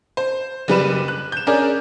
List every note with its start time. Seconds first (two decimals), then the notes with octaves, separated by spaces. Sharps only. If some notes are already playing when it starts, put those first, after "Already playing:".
0.17 C5
0.68 F#1 G3 B4 E7
1.08 F#6
1.32 G6 E7
1.47 C#4 D4 G#4 A#4 D5